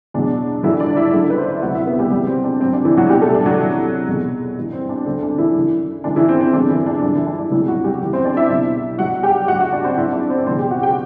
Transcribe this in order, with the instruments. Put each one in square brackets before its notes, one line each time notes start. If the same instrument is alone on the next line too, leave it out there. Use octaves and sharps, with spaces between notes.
[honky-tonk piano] E2 B2 F#3 D4
G2 D3 E3 F#3 E4
D4 D5
E4 E5
F#2 D3 F#3
B4
C5
D5
E5
D2 C3 F#3 F#4 F#5
E4 E5
B3 B4
G3 G4
E2 C3 F#3 G3 G4
C4
D4
G2 C4
F#3
D4
E3 E4
F#3 F#4
C2 B2 F#3 G3 G4
A3 A4
D4
F#3 F#4
C2 C3 E3
E2 B2 F#3
G2 E3
C4
D4
D2 D3 F#3 C4
D4
E3 E4
F#2 E3
F#2 E3 D4
E3 E4
C4
C4
E2 D3 F#3 D4
E3 E4
D4
G2 D3 F#3 D4
E3 E4
D4
D4
E2 C3 E3 F#3 E4
F#3 F#4
G3 G4
F#2 E3
C4 C5
D4 D5
E4 E5
C2 B2 F#3
G2 F#3 F#4 F#5
G4 G5
G2 F#4 F#5
F#3
F#4 F#5
D4 D5
C4 C5
F#2 F#3 E4 E5
D4 D5
C4 C5
E2 B2 F#3 C4 C5
G4 G5
F#4 F#5
G4 G5